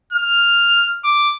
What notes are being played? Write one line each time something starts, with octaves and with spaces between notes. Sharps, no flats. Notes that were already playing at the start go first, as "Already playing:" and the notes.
F6
D6